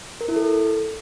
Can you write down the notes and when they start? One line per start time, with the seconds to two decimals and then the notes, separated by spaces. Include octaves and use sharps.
0.21 A#4
0.28 E4
0.36 A4